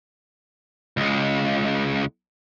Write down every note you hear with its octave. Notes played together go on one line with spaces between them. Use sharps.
C#2 G#3